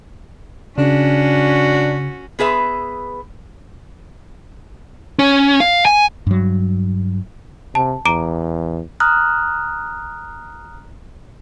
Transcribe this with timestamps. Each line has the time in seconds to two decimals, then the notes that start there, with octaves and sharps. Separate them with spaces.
0.78 C#3 C#4 D4 F#4
2.39 B3 G#4 B4 E5
5.19 C#4
5.60 F5
5.85 G#5
6.27 G2 F#3
7.75 C3 A5
8.06 E2 A#5 D6 D7
9.00 A#5 D#6 F6 F#6